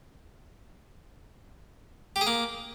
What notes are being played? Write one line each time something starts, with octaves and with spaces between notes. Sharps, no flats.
G4
G#4
A#3